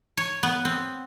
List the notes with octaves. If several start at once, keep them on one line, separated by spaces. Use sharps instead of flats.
C#5
B3
C4